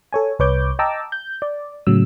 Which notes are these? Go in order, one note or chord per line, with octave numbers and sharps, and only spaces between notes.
A4 C#5 G#5
C2 B4 C#5 D6 G6
D#5 G5 A5 A#5 D6 E6
G6
D5
A2 C#3 F#3 E6